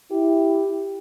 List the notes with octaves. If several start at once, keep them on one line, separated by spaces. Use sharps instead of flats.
E4 G4